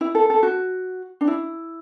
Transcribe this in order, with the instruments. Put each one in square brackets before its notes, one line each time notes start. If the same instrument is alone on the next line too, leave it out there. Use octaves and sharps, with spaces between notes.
[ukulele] E4
A4
A4
F#4
D4
E4